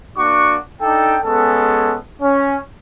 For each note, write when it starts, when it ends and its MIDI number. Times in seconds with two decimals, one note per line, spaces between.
0.18 0.57 58
0.18 0.57 62
0.18 0.57 66
0.18 0.57 85
0.18 0.57 86
0.81 1.17 62
0.81 1.17 63
0.81 1.17 69
0.81 1.17 79
1.24 1.96 56
1.24 1.96 59
1.24 1.96 61
1.24 1.96 69
2.22 2.57 61